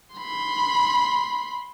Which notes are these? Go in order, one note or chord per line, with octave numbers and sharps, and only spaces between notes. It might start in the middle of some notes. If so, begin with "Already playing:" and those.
B5 C6